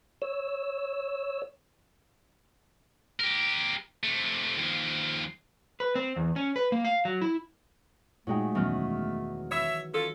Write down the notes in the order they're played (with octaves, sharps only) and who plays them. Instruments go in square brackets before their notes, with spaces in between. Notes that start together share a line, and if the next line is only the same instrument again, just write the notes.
[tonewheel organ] C#5 E6
[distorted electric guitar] G4 A#4
C3 A3
D#2 F3
[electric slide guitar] B4
C4
E2
C#4
B4
A#3
F5
F#3
E4
[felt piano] A#2 G5 [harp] F#3 G#3 D#4 [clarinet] A3
[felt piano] E1 F#2 F6 [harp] D#3 E3 F#3
[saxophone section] C#5 E5
C#4 F4 A4